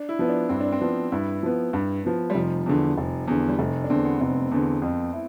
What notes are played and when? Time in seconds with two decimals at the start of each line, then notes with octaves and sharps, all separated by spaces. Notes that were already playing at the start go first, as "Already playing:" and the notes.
Already playing: D4
0.09 E4
0.19 F3 B3
0.29 D4
0.49 G2 C4
0.61 D4
0.72 C4
0.80 F3 B3
1.12 G2 E4
1.43 F3 B3
1.73 G2
2.04 F3 B3
2.30 G3
2.35 F1 F3
2.66 E2 D3
2.98 F1
3.28 E2 D3
3.48 G3
3.59 F1 A3
3.84 D4
3.90 E2 D3 C4
4.05 B3
4.21 F1 C4
4.51 E2 D3
4.82 F2
5.13 E4